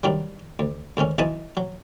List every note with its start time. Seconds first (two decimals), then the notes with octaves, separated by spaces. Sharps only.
0.03 G2 D#3 F#3 G3
0.59 D2
0.97 D2 G#2 D#3 C#4
1.18 B1 E3 D#5 A5 B5 D#6
1.57 F#3